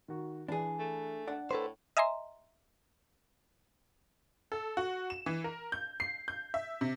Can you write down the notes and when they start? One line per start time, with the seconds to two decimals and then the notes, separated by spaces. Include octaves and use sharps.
0.08 D#3 F#4
0.48 E3 D4 G#4
0.79 A3
1.27 D4 D5 F#5
1.51 A2 A4 B4 C5
1.97 D#5 E5 G#5 A#5 C6
4.52 A4
4.77 F#4
5.10 E7
5.26 E3
5.44 A#4
5.72 G6
6.00 C7
6.28 G6
6.54 E5
6.81 C3